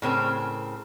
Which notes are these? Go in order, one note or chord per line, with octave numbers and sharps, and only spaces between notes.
A2 C#3 C4 A#4